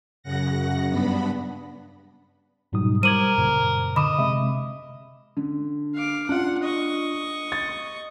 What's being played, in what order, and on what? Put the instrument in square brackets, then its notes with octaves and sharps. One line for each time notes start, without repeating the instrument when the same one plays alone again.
[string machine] F#2 C#3 F#5 A#6
G2 B3 D4 B5
[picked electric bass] G#2 F#3 G3 [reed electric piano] B2 D#4 D#6
[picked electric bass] G3 [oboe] A#4 [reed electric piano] C5 D6 G#6 [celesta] D#7 F#7
[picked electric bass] F#2 A#2 C#3
[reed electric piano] D3 [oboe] D#5 [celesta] B5 D6 E7
[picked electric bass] C3 G#3 C4 [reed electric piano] E5
[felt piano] D3
[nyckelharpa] F5 D6
[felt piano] D4 F4 [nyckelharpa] F#5
[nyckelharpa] D#5 C#6
[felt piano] A6